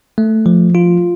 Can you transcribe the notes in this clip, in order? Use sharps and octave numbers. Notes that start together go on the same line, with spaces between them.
A3
F3
F4